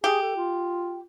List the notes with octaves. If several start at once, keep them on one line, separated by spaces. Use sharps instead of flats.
G4 G#4
A4
F4